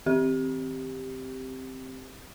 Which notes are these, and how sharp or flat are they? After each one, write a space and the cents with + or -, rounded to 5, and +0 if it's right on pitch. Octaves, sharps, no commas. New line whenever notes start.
E3 -35 C4 +0 G4 +0